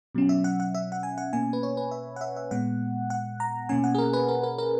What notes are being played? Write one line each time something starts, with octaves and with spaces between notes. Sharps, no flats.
B2 F#3 C#4
E5
F#5
F#5
E5
F#5
G#5
F#5
B2 A#3 C#4 G#5
B4
C#5
B4
E5
F#5
E5
E5
A#2 G#3 B3 F#5
F#5
A#5
B2 A#3 C#4 G#5
F#5
G#4
A#4
B4
A#4
A#4
A#4